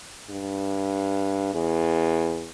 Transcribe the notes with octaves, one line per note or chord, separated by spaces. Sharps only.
G2
E2